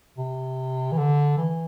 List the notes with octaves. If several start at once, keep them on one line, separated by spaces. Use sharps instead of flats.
C3
E3
D3
E3